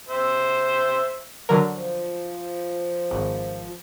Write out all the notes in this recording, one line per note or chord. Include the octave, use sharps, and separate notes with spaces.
C5 E5
D3 F#3 A#4
F3
G#1